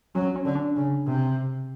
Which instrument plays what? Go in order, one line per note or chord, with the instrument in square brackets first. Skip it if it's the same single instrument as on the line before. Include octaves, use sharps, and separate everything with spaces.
[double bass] F#3 [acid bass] C#4
[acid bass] C#4
[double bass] D3
[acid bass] D4
[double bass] C#3
C3